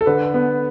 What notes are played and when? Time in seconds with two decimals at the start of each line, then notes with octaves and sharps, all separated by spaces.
0.01 A4
0.06 D3 B4
0.34 B3